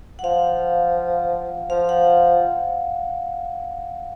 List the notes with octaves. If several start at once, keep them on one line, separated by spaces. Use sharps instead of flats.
F#5
F3 F5
F3 F5
F#5